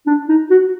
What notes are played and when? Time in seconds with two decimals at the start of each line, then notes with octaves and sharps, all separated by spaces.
0.07 D4
0.29 D#4
0.50 F#4